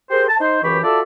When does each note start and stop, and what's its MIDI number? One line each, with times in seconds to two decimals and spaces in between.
0.10 0.25 67
0.10 0.25 68
0.10 0.25 70
0.10 0.25 72
0.28 0.37 81
0.40 0.61 63
0.40 0.61 72
0.63 0.78 37
0.63 0.78 42
0.63 0.78 52
0.63 0.78 67
0.63 0.78 83
0.63 0.78 85
0.84 1.00 65
0.84 1.00 66
0.84 1.00 69
0.84 1.00 74
0.84 1.00 76
0.84 1.00 81